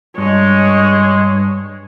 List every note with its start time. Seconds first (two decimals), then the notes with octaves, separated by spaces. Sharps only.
0.18 G2 G#3 C#5